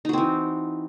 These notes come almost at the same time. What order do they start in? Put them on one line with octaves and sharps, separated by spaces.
D#4 F#4 C4 E3